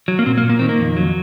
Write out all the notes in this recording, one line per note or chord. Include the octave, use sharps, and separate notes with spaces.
F#3
A#3
A#2 C4
A#3
A#2
A#3
D#3 C4
A#3
F2
F#3